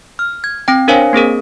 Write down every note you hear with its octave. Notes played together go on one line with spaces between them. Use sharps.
F6
G#6
C4 G5
D4 A#4 C5 C#5 F5 G#5
A#3 C4 G#4 A#4